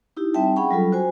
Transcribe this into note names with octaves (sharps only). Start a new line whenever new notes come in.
D#4 E4 G4
G3 C4 D#4 E5 G5 A5
C#4 G#4 F#5 G5 B5 C#6
F#3 G3 F4 A4
F#4 C5 G#5